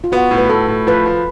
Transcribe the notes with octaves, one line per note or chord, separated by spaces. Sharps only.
F4
B3 F#4
A2
B4
A2 A4
A2
F3 B4
F3